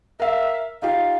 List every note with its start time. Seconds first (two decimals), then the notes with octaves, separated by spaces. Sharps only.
0.20 A#4 E5 F5
0.82 D#4 F4 G4 F5